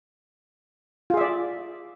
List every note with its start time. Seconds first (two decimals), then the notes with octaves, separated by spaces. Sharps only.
1.10 F4
1.14 G#4
1.17 E5
1.21 D5